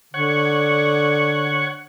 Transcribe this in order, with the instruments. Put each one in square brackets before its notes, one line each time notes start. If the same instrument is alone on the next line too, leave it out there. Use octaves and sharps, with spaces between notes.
[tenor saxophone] D3 [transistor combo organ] C#5 F#5